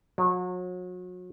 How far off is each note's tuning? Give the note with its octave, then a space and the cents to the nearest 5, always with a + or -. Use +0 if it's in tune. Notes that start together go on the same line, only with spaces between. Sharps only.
F#3 -35